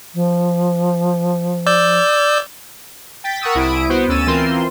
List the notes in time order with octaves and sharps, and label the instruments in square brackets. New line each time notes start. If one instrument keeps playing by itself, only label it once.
[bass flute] F3
[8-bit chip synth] D5 E6 G6
[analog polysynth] G5 A6 B6
A#4 F#5 C#6 D#6 E6
C2 E4 D#6 D7
B3 F#4 C5
D2 C#4 E6 A6 D#7 E7
E3 C4 F4 A#4 C6